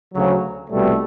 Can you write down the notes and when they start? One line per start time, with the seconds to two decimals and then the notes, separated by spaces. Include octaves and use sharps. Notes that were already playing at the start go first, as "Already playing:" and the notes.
0.14 D2 C#3 F#3
0.70 C2 B2 G3 A3